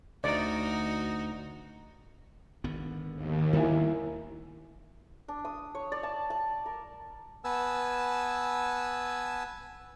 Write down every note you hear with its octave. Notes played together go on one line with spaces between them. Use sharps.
D2 D#4 F#4 D5
G#1 D3 B3
D#2
D#3 G3 A#3 B3 E4 G#5
D4
D#6
C#5
D5
A5
A5
A#4
B3 B4 G#5 A5 E6